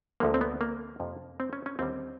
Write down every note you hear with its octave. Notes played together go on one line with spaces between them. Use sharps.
D2 D3 F3 G#3 A#3
C4
B3
A#3
F2 C3 F3
C4
C#4
C#4
D#2 D3 G3 C4